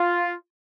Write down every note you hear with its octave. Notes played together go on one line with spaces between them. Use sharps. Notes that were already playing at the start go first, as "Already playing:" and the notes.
Already playing: F4